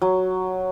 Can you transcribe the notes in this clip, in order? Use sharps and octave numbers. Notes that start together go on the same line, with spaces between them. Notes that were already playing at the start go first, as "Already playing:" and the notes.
F#3